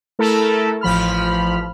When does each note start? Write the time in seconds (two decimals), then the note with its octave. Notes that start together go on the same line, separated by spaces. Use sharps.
0.19 A3 E4 A4 A#4
0.81 A1 F3 B5 F6